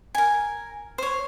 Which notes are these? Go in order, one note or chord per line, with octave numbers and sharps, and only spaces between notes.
A#4 G#5
C5 C#5